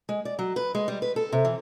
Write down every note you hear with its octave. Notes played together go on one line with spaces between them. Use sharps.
G#3
D5
F#3
B4
G#3
G3
B4
A4
C3
E3